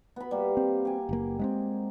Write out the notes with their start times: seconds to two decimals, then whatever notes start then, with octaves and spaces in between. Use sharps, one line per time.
0.16 B3 B5
0.31 G3 A#3
0.57 C4
0.85 G4 G#5
1.09 F#1 A#3
1.39 G#3 B3 C4